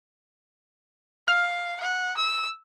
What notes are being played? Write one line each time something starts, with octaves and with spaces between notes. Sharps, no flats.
F5 F6
F#5
E6